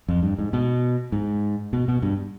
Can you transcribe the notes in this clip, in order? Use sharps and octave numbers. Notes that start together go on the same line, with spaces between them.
F2
G2
G#2
B2
G#2
B2
B2
G2